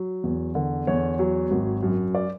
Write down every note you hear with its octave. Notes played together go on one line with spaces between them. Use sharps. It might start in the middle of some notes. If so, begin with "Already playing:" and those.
Already playing: F#3
E2
D3
E2 C#5
F#3
G#1
F#2
D5